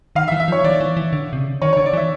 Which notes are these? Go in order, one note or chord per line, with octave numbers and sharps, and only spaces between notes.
D#3 F5
E5
E3
E5
F3
C#5
E3 D5
E3
E3
D3
C3
C#3
D#3 C#5
C#5
D3
D5
E3
E5